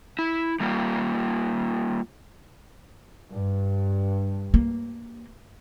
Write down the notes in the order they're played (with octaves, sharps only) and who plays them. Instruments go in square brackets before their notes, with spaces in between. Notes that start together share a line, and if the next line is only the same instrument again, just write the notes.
[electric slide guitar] E4
G3 A#3 F4
[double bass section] G2
[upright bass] A#3